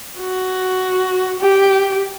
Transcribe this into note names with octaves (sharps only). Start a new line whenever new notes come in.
F#4
G4